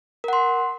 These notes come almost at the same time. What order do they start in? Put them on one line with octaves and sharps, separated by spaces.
A#4 F#5 C6